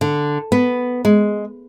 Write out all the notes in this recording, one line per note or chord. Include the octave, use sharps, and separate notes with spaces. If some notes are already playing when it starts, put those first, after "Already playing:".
D3
B3
G#3